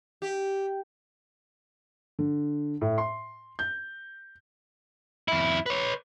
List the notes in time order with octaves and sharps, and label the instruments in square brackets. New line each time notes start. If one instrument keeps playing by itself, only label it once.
[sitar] G4
[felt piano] D3
A2
C6
G6
[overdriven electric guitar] F2 E4
B4 C#5